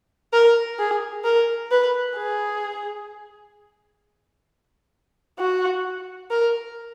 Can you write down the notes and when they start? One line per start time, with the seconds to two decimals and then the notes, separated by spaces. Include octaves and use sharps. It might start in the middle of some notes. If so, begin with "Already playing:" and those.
0.33 A#4
0.79 G#4
1.24 A#4
1.71 B4
2.17 G#4
5.39 F#4
6.31 A#4